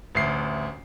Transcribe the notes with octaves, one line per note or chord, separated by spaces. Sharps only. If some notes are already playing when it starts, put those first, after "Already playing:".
A1 D2 C7